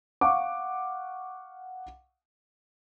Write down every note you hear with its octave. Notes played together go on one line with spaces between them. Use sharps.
F5 F#5 C#6 D6